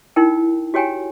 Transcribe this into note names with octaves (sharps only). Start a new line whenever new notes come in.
D#4 E4 A#4 G5
F#4 G4 C#5 G5 G#5 A#5